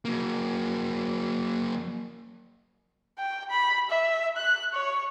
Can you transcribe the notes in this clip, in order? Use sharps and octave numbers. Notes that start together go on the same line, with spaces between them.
F#3 A#3
G5
B5
E5
F#6
C#5